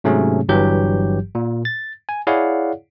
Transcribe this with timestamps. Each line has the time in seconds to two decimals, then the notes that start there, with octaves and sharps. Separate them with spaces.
0.04 G#2 C3 F#3 A3 C#4 G#4
0.49 G1 G2 E3 F#3 G4 G6
1.35 A#2
1.65 A6
2.09 G#5
2.27 E4 G#4 C#5 D5 F5 F#5